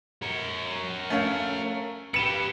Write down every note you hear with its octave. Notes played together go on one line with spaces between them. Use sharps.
A#4 C#5
A3 C#4 F5
G4 B4 C#7 E7